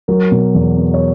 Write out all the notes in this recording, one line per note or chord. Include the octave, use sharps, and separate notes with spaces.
F#3 A#4
B2
E2
B3
C#5